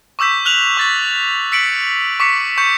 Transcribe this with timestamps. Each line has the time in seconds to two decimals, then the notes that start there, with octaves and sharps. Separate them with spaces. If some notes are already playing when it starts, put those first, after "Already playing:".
0.19 C#6 D6 E6 G6 B6
0.45 F6 F#6 F7 F#7
0.77 C#6 A6 B6
1.52 E6 B6 C#7 D7 F#7
2.20 C#6 D6 B6 C#7
2.58 C#6 G6 C#7